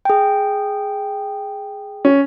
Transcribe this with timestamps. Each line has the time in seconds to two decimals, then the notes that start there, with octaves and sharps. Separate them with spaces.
0.05 G#4 G5
2.05 C#4